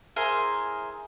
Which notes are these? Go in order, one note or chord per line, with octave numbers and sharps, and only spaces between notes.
E4 G#4 A#4 C5